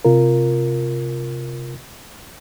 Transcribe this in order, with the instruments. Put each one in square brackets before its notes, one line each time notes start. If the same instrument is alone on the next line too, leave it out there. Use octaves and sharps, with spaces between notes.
[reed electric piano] C3 F4 A#4